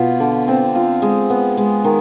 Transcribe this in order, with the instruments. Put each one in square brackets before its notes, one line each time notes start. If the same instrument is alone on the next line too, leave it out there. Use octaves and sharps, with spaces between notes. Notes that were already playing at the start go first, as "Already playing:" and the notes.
Already playing: [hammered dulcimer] B2 F4
D3
C4
F4
G#3
B3
G#3
D#3